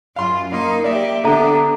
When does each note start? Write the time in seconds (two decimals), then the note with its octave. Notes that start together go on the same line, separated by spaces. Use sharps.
0.16 F#2 F4 F5 C6
0.52 A#3 D#4 F5 C6
0.84 A#3 G4 D5 E5
1.24 D3 B3 D4 G4 A4 E5 A#5